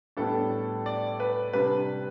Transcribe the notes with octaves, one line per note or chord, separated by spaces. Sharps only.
A2 G3 B3 D4 A4
D5
B4
C3 G3 D4 B4